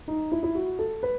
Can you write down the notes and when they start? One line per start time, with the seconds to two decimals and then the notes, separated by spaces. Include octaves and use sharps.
0.08 D#4
0.32 E4
0.43 E4
0.55 F#4
0.79 A4
1.03 B4